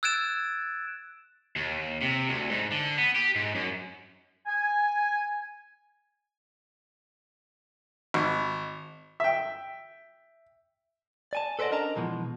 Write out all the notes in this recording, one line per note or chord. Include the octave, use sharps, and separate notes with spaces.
E6 F#6 G#6 A6 D7 E7
D#2
C3
D2
G#2
D3
B3
G4
G#2
F#2
G#5
G#1
E5 G5
D5 G#5 A5
A4 B4 C5 D5 D#5 F#5
C#4 D4 A#4 D#5 A5 A#5
B2 E3 F3 G#3